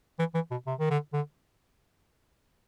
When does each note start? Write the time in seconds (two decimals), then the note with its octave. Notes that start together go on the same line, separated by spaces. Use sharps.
0.19 E3
0.34 E3
0.51 B2
0.67 C3
0.79 D#3
0.90 D3
1.14 D3